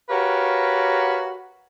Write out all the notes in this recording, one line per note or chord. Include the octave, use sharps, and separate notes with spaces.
F#4 G4 A#4 B4 C#5 F5